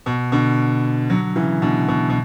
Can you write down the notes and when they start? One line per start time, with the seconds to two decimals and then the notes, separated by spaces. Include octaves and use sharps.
0.06 B2
0.32 B2 D3
1.10 D3 F#3
1.36 C#3 E3
1.62 B2 D3
1.88 B2
2.09 B2